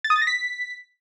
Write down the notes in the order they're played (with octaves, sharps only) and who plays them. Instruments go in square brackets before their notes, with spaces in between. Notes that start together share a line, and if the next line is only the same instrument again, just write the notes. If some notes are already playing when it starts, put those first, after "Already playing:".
[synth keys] A6
D#6
A6
A#6
B6